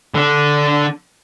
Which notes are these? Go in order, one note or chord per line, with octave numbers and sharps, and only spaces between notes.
D3 D4